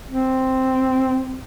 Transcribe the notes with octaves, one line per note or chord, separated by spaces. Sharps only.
C4